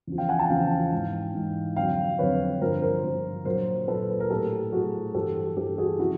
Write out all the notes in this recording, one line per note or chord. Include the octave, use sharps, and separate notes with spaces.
E2 C#3 F3
F5 G5
F#5 G#5
G5 A5
E2 C#3 F3 F5 G5
G#2 E3
G#2 E3
F2 D3 F#3 F5 G5
F2 D3 F#3 B4 C#5
G2 D3 F3 A#4 C5
A#4 C5
G2 D3 F3
A#2 F#3 A#4 C5
A#2 F#3 A4 B4
C5
B4
A#4
A2 F#3 G4 A4
A2 F#3 F#4 G#4
G2 E3 G4 A4
G2 E3 G4 A4
F#4 G#4
C#3 F3 E4 F#4